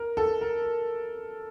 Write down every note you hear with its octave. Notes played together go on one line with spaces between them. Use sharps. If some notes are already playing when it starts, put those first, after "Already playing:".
Already playing: A#4
A4
A#4